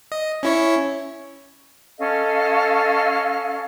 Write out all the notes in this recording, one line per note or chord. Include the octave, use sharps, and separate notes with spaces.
D#5
C#4 E4 C#5
C#4 A4 D#5 F5